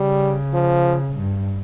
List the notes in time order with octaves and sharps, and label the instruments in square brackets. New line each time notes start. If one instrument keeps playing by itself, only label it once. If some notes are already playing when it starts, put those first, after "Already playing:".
Already playing: [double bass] C#3 [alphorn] G3
[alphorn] F3
[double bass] G2